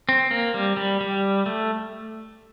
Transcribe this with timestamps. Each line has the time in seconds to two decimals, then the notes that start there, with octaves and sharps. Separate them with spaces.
0.09 C4
0.31 A#3
0.54 G3
0.77 G3
1.01 G3
1.46 A3